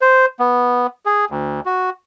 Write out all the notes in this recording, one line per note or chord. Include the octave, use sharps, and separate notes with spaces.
C5
B3
G#4
D2
F#4